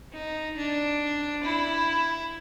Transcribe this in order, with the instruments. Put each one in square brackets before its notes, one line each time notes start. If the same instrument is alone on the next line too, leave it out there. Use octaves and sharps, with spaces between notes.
[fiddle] D#4
D4
E4